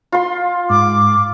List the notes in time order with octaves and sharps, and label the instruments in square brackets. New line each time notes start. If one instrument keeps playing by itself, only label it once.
[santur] F4 C6
[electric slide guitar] G#2 [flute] D6